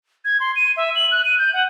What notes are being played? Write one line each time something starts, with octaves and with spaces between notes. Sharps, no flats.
G#6
C6
D#7
E5
F#7
F#6
D#7
G6
F#5